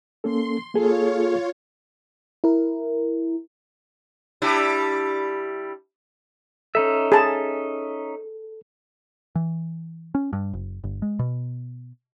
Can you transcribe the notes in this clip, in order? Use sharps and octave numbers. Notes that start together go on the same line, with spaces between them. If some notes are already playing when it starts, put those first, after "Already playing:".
A#3 C#4 A4 C6
A#3 F4 G#4 A4 C#5
E4 A#4
G3 D4 E4
C#4 D#4 A4 E5
G#4 A5
E3
C#4
G2
F#1
G1
G#3
B2